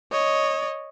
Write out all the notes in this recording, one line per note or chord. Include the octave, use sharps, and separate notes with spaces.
C#5 D#5